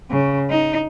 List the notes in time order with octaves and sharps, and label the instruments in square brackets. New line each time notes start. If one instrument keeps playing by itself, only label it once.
[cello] C#3
D#4